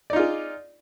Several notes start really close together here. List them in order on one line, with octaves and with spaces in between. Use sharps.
D5 D#4 F4 G#4